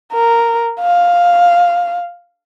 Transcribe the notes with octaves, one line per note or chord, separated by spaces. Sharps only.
A#4
F5